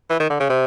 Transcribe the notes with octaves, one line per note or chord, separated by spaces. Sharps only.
E3
D#3
D3
C#3
C3